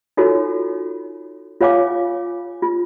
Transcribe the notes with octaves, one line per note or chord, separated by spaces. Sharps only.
D#4 F4 F#4 A4 C#5
F4 C#5 F5 G#5 D6
F4